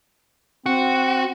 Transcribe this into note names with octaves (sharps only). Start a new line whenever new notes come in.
C4 F#4